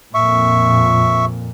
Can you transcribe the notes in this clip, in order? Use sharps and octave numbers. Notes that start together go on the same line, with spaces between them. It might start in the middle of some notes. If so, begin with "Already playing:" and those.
F2 A#2 E5 C#6